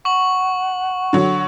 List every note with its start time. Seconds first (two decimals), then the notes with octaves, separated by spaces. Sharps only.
0.05 F#5 C#6 F#7
1.13 D3 F#3